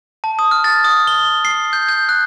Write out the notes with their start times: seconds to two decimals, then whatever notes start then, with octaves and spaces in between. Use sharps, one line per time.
0.24 A5
0.39 D#6
0.51 F6
0.64 A6
0.84 D#6
1.07 G7
1.45 C7
1.73 G6
1.89 G6
2.09 F#6